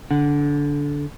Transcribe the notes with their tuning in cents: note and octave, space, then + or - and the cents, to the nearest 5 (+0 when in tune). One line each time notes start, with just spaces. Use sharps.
D3 -20 F#5 +0